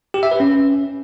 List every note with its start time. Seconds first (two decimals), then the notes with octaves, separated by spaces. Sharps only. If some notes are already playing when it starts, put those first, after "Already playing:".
0.14 G4
0.23 E5
0.31 B4
0.40 C#4